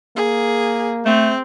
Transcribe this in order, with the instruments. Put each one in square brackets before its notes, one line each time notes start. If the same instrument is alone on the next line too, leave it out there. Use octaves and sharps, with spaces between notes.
[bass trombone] A#3 [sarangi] G#4
[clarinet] A3 [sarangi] C4